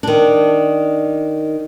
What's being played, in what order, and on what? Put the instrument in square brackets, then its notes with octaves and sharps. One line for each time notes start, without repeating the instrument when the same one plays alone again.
[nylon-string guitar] D#3 D4